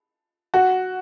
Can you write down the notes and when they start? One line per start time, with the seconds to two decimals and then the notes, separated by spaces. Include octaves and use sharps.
0.54 F#4